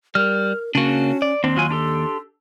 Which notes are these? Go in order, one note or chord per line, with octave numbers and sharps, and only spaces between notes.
G3 A#4 F6
C#3 A#3 C#4 D4 F#4
D5
D#2 C4 D4 C6
F#3 F4 G#5
D4 G4 A4